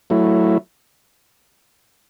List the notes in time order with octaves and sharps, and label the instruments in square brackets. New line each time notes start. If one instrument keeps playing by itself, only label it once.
[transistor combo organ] F#3 A3 E4